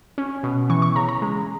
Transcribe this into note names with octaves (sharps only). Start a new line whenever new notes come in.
C#4
B2
E3 C#6
C#6
C#3 A#5
A#5
G#3